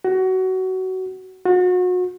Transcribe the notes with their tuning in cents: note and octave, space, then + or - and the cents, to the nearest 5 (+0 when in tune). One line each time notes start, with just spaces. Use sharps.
F#4 +20
F#4 -35